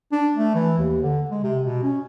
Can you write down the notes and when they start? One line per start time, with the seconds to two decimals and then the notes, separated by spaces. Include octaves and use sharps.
0.12 D4
0.35 A3
0.55 E3
0.78 D#2
1.03 D3
1.31 G#3
1.43 C3
1.63 B2
1.83 C#4